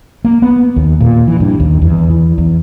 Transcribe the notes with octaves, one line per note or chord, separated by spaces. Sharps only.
A#3
B3
D#2
A#2
E3
G2
D#2
E2
E3
E2